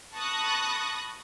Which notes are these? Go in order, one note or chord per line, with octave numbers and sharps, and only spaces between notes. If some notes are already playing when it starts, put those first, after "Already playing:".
A5 B5 C#6 D#6 F#6 A#6